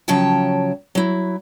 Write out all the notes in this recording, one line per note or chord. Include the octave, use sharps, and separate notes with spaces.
C#3 F3 F#3 C#5 G5 A5
F#3 E4